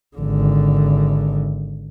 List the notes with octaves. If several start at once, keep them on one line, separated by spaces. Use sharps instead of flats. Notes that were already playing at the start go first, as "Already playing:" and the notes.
G#1 D3